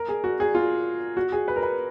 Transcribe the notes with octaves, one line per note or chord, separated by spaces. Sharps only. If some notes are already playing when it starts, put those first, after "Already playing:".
Already playing: A#4
G#4
F#4
G#4
F4
F#4
G#4
B4
A#4
B4